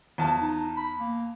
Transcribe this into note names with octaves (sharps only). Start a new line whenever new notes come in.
E2 F3 A5
D#4
B5
A#3